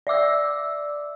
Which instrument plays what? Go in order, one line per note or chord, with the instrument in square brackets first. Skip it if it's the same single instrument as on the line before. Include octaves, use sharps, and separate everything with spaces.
[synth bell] D5 E5 D6 E6